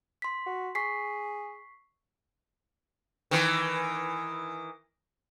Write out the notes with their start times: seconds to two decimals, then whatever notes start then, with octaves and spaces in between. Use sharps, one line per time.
0.22 C6 B6
0.46 F#4
0.75 G#4 C#6 B6 C7
3.31 D#3 E3